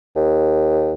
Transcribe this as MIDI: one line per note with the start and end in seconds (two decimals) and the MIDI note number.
0.16 0.94 39